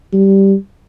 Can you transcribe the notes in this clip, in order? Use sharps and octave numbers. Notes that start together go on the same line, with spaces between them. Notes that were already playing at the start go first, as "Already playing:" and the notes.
G3